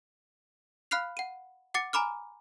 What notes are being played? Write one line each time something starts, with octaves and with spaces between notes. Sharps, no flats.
F5 B5 F6 F#6 C7 F7
F#5 D#7
F#5 D6 A6 C#7
G#5 A#5 B5 D6 F6